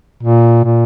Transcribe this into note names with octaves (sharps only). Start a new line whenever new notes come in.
A#2
A#2